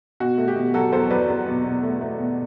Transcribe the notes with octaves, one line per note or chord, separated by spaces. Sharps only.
B2 F#4
A3
G4
B2
F#3 F#4 A4
E2 A4 C5
F#3 B4 D5
E2
B2
B2
A3
A3
B2